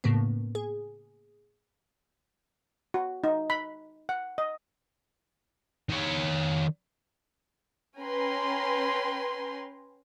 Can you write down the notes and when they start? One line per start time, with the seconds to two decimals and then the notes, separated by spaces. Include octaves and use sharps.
0.04 A2 C#3 A#3 B3
0.55 G#4
2.94 F#4
3.24 D#4
3.50 B5
4.09 F#5
4.38 D#5
5.89 D#3 C#5
7.98 C#4 B4 G5 G#5 A#5 C6